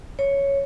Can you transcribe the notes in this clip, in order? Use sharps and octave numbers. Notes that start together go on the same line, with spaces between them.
C#5